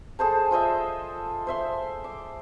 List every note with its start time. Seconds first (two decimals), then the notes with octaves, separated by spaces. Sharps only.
0.19 G#4 A4 C5 A5
0.51 F4 C5 D#5 E5
1.47 C5 E5 C6
2.04 D6